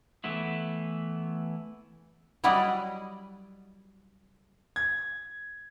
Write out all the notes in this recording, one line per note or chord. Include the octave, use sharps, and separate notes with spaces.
E3 A3 B3 E4
F#3 G3 E4 F#4 D5 D#5
G#6